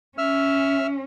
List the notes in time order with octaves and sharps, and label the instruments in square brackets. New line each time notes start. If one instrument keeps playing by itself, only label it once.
[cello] C#4 [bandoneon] E5 E6 F6